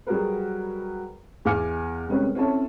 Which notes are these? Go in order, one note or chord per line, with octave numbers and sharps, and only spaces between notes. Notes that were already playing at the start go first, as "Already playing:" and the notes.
F#3 G3 F#4 G#4 A#4 B4
E2 F5 G#5 D6 F6 C#7
C3 G3 G#3 C#4 A#4 B4
C4 C#4 E4 A4 C#5 A5